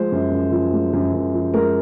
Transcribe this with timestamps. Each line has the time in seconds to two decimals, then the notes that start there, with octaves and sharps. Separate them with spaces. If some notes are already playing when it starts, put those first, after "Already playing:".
Already playing: F3 G#3 C5
0.12 F#2
0.32 F#2
0.52 F3
0.73 G#3
0.93 F#2
1.13 F#2
1.34 F3
1.54 G#3 A#4